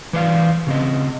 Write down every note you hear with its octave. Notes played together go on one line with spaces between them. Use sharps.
E3 B4 C5 D5 E5 F5
C#3 C4 D#5